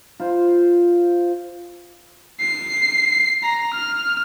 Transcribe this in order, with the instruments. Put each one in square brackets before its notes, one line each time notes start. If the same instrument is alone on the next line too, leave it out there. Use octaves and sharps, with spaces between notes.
[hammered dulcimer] F4 C5
[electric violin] C7
A#5
F6